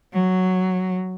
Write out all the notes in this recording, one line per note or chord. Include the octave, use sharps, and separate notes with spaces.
F#3